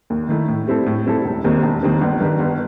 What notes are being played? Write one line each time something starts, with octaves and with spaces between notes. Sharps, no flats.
D#2
D#3 A3 E4
A2
G3 C4 E4 A4
A2
G3 C4 E4 A4
E1
D#2 D#3 G3 C4
E1
D#2 D#3 G3 C4
G1
G2 D#3 G3
G1